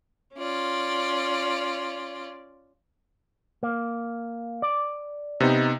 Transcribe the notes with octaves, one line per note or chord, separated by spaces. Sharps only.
C#4 F4 D5
A#3
D5
C3 B3 D#4